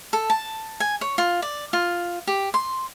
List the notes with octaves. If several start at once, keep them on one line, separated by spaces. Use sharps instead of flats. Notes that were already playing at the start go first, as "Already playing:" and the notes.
A4
A5
G#5
C#5
F4
D5
F4
G4
C6